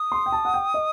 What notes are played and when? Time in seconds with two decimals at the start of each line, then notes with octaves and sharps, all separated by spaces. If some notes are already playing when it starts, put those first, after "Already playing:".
Already playing: D#6
0.12 C6
0.26 G5
0.32 A5
0.45 F#5
0.54 G5
0.74 D#5